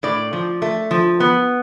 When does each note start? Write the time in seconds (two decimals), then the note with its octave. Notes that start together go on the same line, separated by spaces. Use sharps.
0.03 A2 D5
0.33 F3
0.62 A3
0.91 F3
1.20 B3